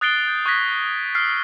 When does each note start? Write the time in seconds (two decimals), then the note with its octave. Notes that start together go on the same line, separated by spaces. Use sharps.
0.01 D#6 F#6 A6 C7 D7 G7
0.28 G6
0.45 C#6 D#6 F#6 G#6 A#6 B6
1.15 E6 F6 C7